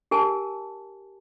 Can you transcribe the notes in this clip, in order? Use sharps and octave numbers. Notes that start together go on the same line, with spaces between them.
G4 A#4 G#5 A5